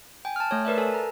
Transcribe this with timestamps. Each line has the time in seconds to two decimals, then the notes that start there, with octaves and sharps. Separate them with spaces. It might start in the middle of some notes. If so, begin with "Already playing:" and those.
0.25 G5 G#5
0.36 A5 F6
0.51 A3 C#5
0.65 A#4 B4 D5 E5
0.78 A4 A#4 G#5 A5
0.94 A#5